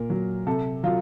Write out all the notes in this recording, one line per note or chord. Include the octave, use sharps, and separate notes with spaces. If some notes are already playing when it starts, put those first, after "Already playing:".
Already playing: A#2 A#4
F#3
C3 A4
F#3 F4